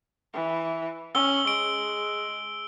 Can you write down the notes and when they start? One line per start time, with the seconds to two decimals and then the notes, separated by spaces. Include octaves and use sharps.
0.34 E3
1.15 C#4 E6 G7
1.47 G#3 D7